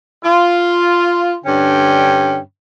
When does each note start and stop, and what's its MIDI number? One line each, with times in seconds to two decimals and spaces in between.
0.24 1.37 65
1.45 2.39 43
1.45 2.39 50
1.45 2.39 61
1.45 2.39 79